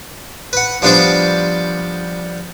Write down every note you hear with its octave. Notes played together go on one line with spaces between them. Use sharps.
B4 F#5
F3 G3 B3 D4 C5 D5